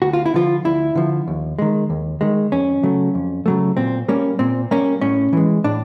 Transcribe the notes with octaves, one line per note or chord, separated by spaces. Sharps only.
D2 F#4
F4
E4
D3 F3 F4
D2 E4
D3 F3
D#2
D#3 G#3
D#2
D#3 G#3
F2 C#4
C#3 F#3 A3
F2
C#3 F#3 A3
A#2 C4
G3 A#3 C#4
A#2 C4
G3 A#3 C#4
A2 C#4
E3 G#3
A2 D4